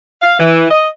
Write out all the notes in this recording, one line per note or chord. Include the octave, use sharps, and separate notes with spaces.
F5
E3
D#5